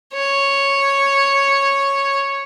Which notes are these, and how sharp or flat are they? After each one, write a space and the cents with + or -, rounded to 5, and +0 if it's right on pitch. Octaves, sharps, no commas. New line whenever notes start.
C#5 -5